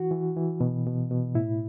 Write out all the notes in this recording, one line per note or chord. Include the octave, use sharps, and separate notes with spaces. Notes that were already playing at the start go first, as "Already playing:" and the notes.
Already playing: E3 F#4
E3
E3
B2
B2
B2
A2 E4